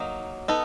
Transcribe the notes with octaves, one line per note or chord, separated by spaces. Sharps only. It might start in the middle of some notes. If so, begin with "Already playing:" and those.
Already playing: F#3 A#3 D#4
B3 D#4 A4